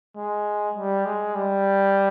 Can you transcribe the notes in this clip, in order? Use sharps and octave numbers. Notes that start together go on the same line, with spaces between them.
G#3
G3
G#3
G3